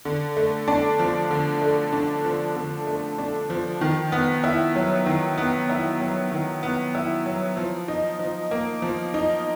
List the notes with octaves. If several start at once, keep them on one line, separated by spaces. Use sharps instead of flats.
D3
A3
D4
F3
D3
A3
D4
F3
D3
A3
D4
F3
D#3
B3
E4
F#3
D#3
B3
E4
F#3
D#3
B3
E4
F#3
F3
D#4
F3
A#3
F3
D#4